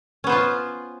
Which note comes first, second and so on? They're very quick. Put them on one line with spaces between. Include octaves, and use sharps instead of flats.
C#4 B3 C5 F4